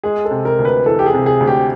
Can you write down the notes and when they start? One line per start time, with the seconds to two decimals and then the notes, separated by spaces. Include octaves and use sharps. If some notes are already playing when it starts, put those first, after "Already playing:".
0.03 G#3 G#4
0.25 A4
0.31 C3
0.45 A#4
0.59 D2
0.65 B4
0.86 E3 A4
0.99 G4
1.06 G#4
1.14 C3
1.26 G#4
1.40 D2
1.47 G4